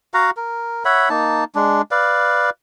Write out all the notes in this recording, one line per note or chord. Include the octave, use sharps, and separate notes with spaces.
F#4 F5 F#5 A#5
A#4
C#5 E5 F#5 B5
A#3 D#4 A5
G#3 D4
B4 D5 F5